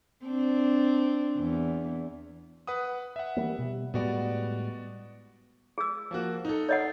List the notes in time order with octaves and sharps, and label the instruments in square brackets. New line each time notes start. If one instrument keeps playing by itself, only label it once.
[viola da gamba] C4 D4
E2
[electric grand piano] B4 F#5 D#6
E5 F#5
[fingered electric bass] E3 G3 A#3
B2 G3
[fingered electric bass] A2 G3 G#3 [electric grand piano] B3 F#4 D5
[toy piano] G#4 E6
[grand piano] F3 A#3 F#4
D#4 A4
[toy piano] C#5 D#5 F#5